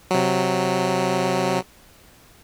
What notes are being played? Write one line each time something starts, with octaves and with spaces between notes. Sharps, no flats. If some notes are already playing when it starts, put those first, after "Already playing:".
C3 F#3